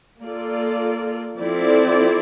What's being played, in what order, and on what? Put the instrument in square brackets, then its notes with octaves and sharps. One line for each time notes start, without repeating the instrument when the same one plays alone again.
[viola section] A#3 F4 A4 D5
F3 C4 E4 A4 D5